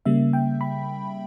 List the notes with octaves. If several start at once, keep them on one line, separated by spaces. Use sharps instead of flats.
C#3 G3 A#3 E5
G5
B5